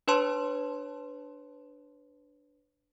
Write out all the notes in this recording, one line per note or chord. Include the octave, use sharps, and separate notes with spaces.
D4 B4 C#5 A5 C6